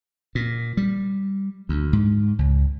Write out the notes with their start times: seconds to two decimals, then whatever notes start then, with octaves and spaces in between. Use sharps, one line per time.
0.35 A#2
0.77 G3
1.69 D2
1.93 G#2
2.39 C#2